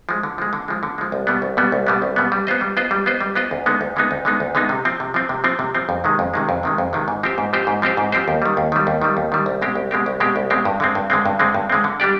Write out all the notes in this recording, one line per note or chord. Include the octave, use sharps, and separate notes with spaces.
F3 G#3
D3
F3 G#3
D3
F3 G#3
D3
F3 G#3
C2
B2 G3 B3
C2
B2 G3 B3
C2
B2 G3 B3
C2
B2 G3 B3
G3
B3 F4 C5 D#5
G3
B3 F4 C5 D#5
G3
B3 F4 C5 D#5
G3
B3 F4 C5 D#5
D2
D3 G#3 B3 D#4
D2
D3 G#3 B3 D#4
D2
D3 G#3 B3 D#4
D2
D3 G#3 B3 D#4
C3
F3 C4
C3
F3 C4
C3
F3 C4
C3
F3 C4
F2
C3 D#3 G#3
F2
C3 D#3 G#3
F2
C3 D#3 G#3
F2
C3 D#3 G#3
G#2
F3 C4 G4 C5
G#2
F3 C4 G4 C5
G#2
F3 C4 G4 C5
G#2
F3 C4 G4 C5
D#2
D#3 G3
D#2
D#3 G3
D#2
D#3 G3
D#2
D#3 G3
C2
B2 G#3 C4 G4
C2
B2 G#3 C4 G4
C2
B2 G#3 C4 G4
C2
B2 G#3 C4 G4
G2
D3 G#3 C4
G2
D3 G#3 C4
G2
D3 G#3 C4
G2
D3 G#3 C4
D3
G3 D4 G4 D5